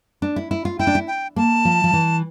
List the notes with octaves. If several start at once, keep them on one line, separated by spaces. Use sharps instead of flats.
D4
E4
E4
F4
E4 G5
D4
E4
G5
A#3 A5
F3
F3
E3